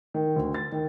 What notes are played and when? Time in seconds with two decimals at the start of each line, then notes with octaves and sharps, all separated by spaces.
0.14 D#3
0.36 D2
0.55 A6
0.72 D#3